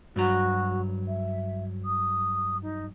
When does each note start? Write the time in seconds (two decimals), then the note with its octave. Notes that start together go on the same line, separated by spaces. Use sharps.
0.16 G2 F#3 F#4 A#5
1.08 E5
1.85 D#6
2.62 D#4